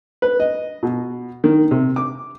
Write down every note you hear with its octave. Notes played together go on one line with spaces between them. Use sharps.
B4
D#5
B2
D#3
C3
D6